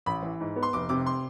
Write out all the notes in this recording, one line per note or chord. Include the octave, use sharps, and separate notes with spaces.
A1 B5
E3
G#2
B3
C6
F1 D6
C3 D6
C6